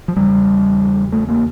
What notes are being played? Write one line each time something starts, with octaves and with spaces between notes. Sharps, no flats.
F3
E2 C#3 G3
A3
A#3